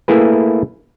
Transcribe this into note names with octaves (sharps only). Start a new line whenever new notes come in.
A3 A#3 E4 G#4 B4